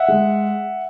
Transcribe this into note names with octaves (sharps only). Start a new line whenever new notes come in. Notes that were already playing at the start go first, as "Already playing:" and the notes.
Already playing: E5 F#5
G#3